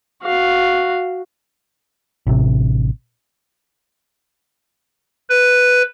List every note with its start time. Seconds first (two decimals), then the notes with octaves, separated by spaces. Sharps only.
0.23 F#4 F5
2.27 A1 C3
5.29 B4